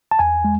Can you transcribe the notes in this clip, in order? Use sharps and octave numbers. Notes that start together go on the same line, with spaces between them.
A5
E2 G#5
G#3